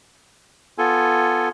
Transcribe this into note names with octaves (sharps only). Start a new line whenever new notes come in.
B3 F4 A4 G#5